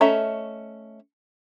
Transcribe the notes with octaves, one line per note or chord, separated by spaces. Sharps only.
A3 C#4 D#5 E5 A#5